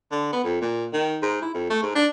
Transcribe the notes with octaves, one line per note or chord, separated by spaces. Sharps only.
D3
B3
F2
A#2
D#3
G#2
E4
F2
A3
G#2
D4